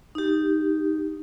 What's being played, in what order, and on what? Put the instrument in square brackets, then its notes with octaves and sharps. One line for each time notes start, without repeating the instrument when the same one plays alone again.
[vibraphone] D#4 G4